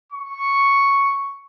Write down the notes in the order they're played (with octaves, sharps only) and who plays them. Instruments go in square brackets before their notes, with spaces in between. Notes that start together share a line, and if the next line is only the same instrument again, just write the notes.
[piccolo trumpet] C#6